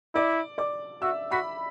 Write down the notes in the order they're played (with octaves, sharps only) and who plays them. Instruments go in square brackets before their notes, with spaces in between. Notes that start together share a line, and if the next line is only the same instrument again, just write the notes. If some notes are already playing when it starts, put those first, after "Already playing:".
[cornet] E4 [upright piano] D5 D6
[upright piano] D5 D6
[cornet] F#4 [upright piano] E5 E6
[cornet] F#4 [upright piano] B5 B6